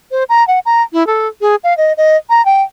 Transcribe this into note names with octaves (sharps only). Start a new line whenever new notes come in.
C5
A#5
F#5
A#5
E4
A4
G#4
F5
D#5
D#5
A#5
G5